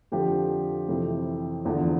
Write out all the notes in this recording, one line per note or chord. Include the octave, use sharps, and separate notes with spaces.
F2 D3 F3 G4
F2 C3 E3
E2 D3 F3